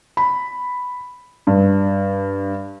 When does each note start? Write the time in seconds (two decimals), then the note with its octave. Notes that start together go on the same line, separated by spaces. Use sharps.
0.17 B5
1.47 G2